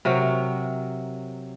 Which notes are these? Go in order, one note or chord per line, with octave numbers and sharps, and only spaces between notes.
C3 F#3 A#4